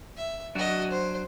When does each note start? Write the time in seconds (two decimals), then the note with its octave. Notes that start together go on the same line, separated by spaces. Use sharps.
0.17 E5
0.55 F#3 D4 F#4 D#5
0.91 C5